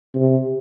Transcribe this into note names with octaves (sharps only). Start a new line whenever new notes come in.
C3